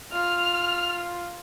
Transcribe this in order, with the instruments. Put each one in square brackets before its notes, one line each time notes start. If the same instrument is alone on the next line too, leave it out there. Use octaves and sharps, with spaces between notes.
[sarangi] F4 [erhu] F6